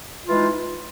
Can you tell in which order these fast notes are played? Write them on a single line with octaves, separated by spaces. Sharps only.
F4 E3 G#3 D#4